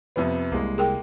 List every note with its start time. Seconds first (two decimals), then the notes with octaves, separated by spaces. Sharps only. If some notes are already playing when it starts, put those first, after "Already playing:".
0.16 F2 C3 B3
0.52 C2 G#3 A#3
0.78 G#4 A#4 G5